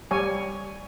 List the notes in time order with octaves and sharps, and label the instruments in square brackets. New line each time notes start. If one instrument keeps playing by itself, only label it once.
[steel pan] G3 C#5 G#5